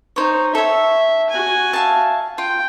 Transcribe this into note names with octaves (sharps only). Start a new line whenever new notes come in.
D#4 C5 C#5
A4 C#5 E5
F#4 G#5
E5 F5 A5
F4 G5